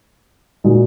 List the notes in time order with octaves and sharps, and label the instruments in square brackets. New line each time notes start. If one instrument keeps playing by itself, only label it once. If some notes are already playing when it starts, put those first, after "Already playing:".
[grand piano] A#2 G#3 D#4 F#4